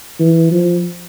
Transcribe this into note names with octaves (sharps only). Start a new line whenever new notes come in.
E3
F3